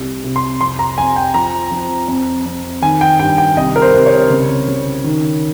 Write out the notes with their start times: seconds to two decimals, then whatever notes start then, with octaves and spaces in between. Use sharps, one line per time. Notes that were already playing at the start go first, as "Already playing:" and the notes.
Already playing: C2
0.24 C3
0.36 C6
0.60 F2 C6
0.79 A#5
0.98 F2 G#5
1.16 G5
1.34 F3 A#5
1.71 F3
2.08 F2
2.46 F2
2.82 D#3 G#5
3.01 G5
3.19 G2 G5
3.38 G5
3.56 C2 D#5
3.76 A#4
3.82 C5
3.94 C2
4.06 C#5
4.30 C#3
4.68 C#3
5.04 D#3